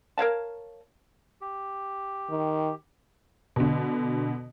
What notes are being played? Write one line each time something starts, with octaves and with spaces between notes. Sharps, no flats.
A#4 C#5 F5 A5
G4
D#3
B2 D3